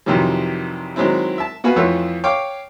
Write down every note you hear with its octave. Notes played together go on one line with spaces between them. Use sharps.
F2 C3 D#3 E3 F#3 G3
D#3 F#3 G#3 C4 E4
E5 A5
B3 F#4 B4 F5 G#5
F2 E3 A3 F4 C#5 E5
C#5 F5 G5 D6